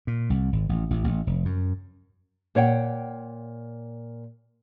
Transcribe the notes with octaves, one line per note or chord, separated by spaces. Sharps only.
A#2
C2
G#1
A1
A1
A1
F1
F#2
A#2 C#5 F#5 G5